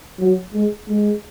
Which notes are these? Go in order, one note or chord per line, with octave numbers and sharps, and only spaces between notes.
F#3
G#3
G#3